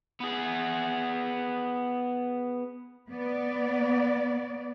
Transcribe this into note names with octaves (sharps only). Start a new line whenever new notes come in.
B3 G#4
B3 D5